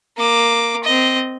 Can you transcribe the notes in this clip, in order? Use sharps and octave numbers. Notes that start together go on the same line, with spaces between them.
A#3 D6
C4 D#5